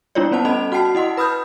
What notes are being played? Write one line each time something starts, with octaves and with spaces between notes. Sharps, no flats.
G3 D4 E4 F4 C#5 D5
B3 C#4 C5 F#5 A5
C#4 A4 D#5 B5 F7
F#4 F#5 G5 A5 C7
E4 D#5 F#5 C6
B4 B5 D#6 F6 G6